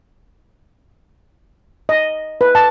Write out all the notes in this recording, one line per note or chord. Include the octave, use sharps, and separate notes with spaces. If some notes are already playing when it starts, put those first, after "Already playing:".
D#5
B4
A5